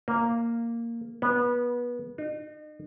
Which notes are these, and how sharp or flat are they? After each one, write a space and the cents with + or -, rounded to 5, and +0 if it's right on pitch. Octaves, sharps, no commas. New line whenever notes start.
A#3 -5
B3 -25
D#4 -40